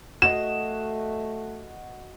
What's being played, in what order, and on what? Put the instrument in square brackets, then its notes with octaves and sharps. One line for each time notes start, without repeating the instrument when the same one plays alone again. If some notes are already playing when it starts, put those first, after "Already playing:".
[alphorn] A3 [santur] F#4 D#5 D#6 [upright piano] E7